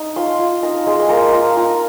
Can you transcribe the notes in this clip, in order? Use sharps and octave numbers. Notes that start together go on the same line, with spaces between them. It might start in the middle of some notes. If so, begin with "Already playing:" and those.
Already playing: D#4
F4 C6
F4
D#4 A#5
G#3
C6
A#3 A#5
F4 A#5
F4 A#5